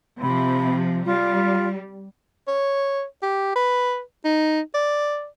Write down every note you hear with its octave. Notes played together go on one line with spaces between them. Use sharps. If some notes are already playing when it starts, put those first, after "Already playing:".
C3 F3 B5
G3 F4
C#5
G4
B4
D#4
D5